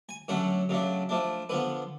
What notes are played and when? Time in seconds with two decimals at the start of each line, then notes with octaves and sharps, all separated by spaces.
0.09 G#5
0.28 D3 F#3 A3 C#4 F#5
0.69 C#3 F#3 A3 D4
1.09 F3 A3 D4
1.49 D3 F3 B3 B4